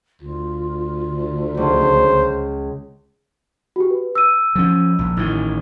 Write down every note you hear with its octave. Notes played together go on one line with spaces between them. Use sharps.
D2 F4
C#2 C5
F#4 G4
B4
E6 D#7
F3 C#4
A#1
A1 A2 D#3